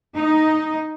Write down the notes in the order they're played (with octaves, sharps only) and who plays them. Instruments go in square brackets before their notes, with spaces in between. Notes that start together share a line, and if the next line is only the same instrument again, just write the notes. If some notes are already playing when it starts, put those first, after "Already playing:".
[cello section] D#4